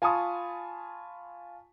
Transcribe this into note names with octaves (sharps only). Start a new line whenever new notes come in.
F4 G#5 A5 B5 C#6 D#6